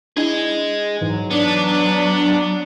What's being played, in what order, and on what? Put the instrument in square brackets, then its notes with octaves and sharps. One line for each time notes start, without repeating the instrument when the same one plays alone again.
[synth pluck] D4 E4 [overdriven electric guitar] G#4 D#5
[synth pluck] G#2 E3 [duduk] F#3
[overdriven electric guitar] B3 [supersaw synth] D4